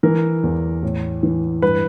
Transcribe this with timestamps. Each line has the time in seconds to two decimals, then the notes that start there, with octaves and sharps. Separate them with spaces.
0.03 E3 A#4
0.43 E2
0.83 A2
1.23 E3
1.62 G2 B4